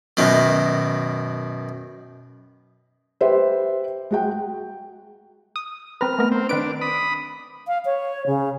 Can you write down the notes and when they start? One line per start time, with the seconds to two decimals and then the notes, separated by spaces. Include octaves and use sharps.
0.17 F#2 B2 D#3
3.21 G4 B4 C5 E5
4.11 G#3 F#4 G5
5.56 D#6
6.01 C4 A#4 B4 F6
6.18 A3 B3 A#4
6.32 C4
6.49 D#3 D4 B4 D7
6.81 B5 D#6
7.68 F5
7.85 C#5
8.26 C#3